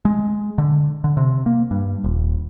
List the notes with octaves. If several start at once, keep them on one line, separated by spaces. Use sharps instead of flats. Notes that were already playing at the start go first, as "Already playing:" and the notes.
G#3
D3
D3
C3
A#3
G2
D#1